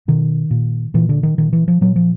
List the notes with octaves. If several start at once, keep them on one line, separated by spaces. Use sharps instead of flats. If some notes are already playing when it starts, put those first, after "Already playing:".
B2 D#3
A#2
A#2 E3
D3
D#3
A#2 D#3
E3
F3
A#2 F#3
F3